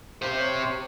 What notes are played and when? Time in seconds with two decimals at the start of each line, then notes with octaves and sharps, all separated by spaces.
0.22 G4 C5 F5
0.40 C#5